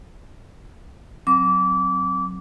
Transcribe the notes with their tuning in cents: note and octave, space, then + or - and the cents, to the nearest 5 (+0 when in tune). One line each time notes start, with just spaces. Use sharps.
F#3 +0 C4 +0 D6 -25